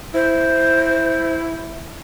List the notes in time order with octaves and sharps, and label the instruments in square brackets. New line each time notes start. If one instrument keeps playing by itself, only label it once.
[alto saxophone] E4 [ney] C5